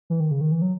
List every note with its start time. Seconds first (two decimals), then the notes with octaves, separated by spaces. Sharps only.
0.10 E3
0.20 D#3
0.31 C#3
0.41 D#3
0.52 E3
0.62 F#3